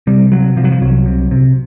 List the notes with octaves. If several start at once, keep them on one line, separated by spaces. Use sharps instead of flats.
C3 G3
C3 F#3
C3 F3
F#3
F3
C2 F#3
C3
C3